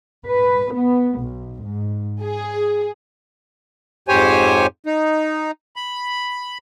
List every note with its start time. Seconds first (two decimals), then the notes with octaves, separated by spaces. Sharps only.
0.25 B4
0.74 B3
1.20 B1
1.63 G#2
2.21 G#4
4.08 F2 G#2 G4 C5 C#5 G#5
4.86 D#4
5.76 B5